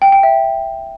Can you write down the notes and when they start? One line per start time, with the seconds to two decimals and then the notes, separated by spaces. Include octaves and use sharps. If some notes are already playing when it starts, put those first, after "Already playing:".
0.02 G5
0.12 G5
0.23 E5